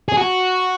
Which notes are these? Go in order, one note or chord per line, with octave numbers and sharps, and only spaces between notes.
G#4
F#4